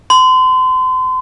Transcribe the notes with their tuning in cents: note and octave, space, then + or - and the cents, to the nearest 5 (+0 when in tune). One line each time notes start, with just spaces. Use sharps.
C6 -35